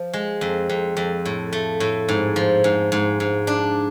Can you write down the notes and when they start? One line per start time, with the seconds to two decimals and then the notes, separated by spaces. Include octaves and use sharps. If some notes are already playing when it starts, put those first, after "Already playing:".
Already playing: F3
0.13 G#3
0.41 F2
0.69 F2
0.97 F2
1.25 A2
1.53 A3
1.80 A2
2.09 G#2
2.36 F3
2.64 G#2
2.92 G#2
3.20 G#2
3.47 D4